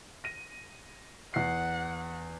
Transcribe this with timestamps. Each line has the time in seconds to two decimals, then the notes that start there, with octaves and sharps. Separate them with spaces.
0.24 A#6 D#7
1.34 E2 F#5 C7